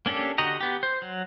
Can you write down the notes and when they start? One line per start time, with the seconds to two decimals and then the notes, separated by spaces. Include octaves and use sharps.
0.06 A#3 C#4 D4 G4 A4
0.38 D3 F#4 G4 D#5 A#5
0.61 B3 G4
0.83 C5
1.02 F#3